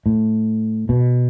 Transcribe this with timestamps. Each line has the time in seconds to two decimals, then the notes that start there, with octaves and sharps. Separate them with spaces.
0.06 A2
0.89 B2